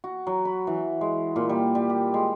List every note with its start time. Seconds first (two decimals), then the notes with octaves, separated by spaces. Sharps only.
0.04 F#4
0.27 F#3
0.45 B5
0.67 E3
1.01 G#3
1.36 A#2
1.49 G3
1.75 G3
1.90 G4
2.14 G#3